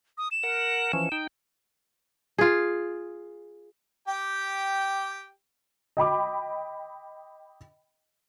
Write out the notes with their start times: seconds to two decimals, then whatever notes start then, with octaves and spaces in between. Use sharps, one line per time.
0.18 D#6
0.31 E7
0.43 A#4 F#5
0.93 E3 F3 C#4
1.12 D#4 G5
2.38 F4 G#4
4.08 G4 G5
5.97 D#5 G5 B5 D6